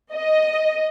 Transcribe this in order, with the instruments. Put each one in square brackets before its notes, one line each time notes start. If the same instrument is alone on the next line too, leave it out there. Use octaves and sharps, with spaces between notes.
[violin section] D#5